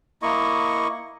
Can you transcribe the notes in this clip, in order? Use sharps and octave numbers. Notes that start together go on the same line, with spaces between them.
A#3 E4 D#5 C#6